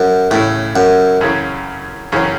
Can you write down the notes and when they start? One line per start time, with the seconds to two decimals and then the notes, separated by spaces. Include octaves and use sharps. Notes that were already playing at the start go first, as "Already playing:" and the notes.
Already playing: F#2
0.31 A2 C#3 E3 A3 C#4 E4
0.76 F#2
1.21 F#2 C#3 E3 C#4
2.12 F#2 C#3 E3 C#4